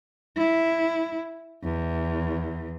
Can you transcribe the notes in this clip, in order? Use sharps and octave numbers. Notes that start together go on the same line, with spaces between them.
E4
E2